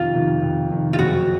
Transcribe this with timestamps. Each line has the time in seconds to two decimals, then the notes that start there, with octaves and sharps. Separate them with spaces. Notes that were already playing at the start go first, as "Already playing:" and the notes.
Already playing: F2 C3 D#3 F4
0.14 F2 C3 D#3
0.42 F2 C3 D#3
0.70 F2 C3 D#3
0.93 F4
0.99 F#1 F2 C#3 F#3 F#4